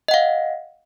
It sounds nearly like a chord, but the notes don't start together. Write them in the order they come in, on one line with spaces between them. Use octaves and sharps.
D#5 F#5 F5